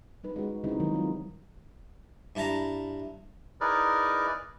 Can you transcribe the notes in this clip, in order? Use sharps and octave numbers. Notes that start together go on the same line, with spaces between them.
G3 D#4 B4
G#3 C#4 F#4
C#3 G3 C4 D#4 E4 F#4
D#3 F#3 G#3
G3 C4 F4
G2 E4 A5 A#5
D#4 E4 G#4 A#4 B4 D5